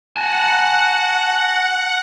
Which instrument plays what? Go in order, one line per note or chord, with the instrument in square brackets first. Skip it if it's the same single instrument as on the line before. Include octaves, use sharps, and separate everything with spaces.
[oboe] F#4 [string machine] F#5 [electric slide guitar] G#5 A5